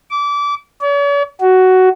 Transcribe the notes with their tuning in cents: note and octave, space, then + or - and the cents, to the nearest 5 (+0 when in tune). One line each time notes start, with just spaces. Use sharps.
D6 -25
C#5 +45
F#4 +10